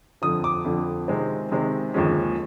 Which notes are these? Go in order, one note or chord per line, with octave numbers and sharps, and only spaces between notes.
F2 D3 F3 D#6
D6
F2 D3 F3
C3 D#3 G#3 C4
C3 D#3 G#3 C4
D#2 D3 F3 G#3 C#4